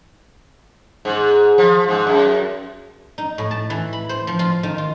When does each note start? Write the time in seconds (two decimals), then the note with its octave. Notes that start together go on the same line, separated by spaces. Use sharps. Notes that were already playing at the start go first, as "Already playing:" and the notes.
1.05 G#2
1.58 F3
1.88 G#2
2.07 F#2
3.18 D#4
3.38 A2
3.51 A5
3.70 E3
3.93 B5
4.09 C5
4.27 F3
4.39 F4
4.63 D#3
4.78 F4